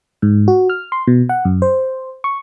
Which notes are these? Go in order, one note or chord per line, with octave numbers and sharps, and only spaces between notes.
G#2
F#4
F6
C6
B2
F#5
F#2
C5
C#6